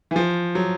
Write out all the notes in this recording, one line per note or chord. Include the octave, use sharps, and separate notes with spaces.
E3
F3
F#3